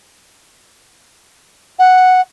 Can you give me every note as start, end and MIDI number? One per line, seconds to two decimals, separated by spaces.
1.79 2.21 78